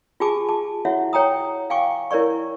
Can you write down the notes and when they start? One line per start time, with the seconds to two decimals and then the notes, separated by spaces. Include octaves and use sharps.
0.20 F4 G4 G#4 G#5 A5 D6
0.49 A5 D6
0.85 E4 F#4 C#5 E5 F#5
1.13 C#5 G5 A#5 D#6
1.70 F5 G5 G#5 C#6 D6
2.11 E4 A#4 C#5 D5 C#6